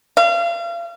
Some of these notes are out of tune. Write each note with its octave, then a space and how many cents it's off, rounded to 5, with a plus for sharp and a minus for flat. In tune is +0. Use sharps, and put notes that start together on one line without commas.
F5 -35